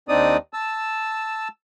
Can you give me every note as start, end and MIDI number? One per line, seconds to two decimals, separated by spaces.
0.09 0.37 39
0.09 0.37 60
0.09 0.37 62
0.09 0.37 63
0.09 0.37 74
0.09 0.37 87
0.53 1.48 81
0.53 1.48 88